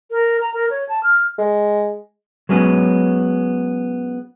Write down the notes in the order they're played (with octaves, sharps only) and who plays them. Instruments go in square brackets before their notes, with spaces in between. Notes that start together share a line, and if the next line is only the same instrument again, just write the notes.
[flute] A#4
A#5
A#4
C#5
A5
F6
[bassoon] G#3
[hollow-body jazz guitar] F#3 G#3 B3 C#4